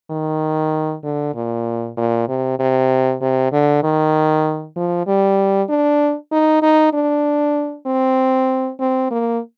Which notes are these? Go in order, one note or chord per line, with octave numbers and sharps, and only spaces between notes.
D#3
D3
A#2
A#2
C3
C3
C3
D3
D#3
F3
G3
D4
D#4
D#4
D4
C4
C4
A#3